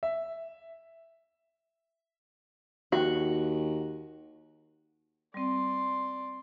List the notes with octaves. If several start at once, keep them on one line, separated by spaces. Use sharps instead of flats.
E5
D#2 F#4
G3 C4 D5 C6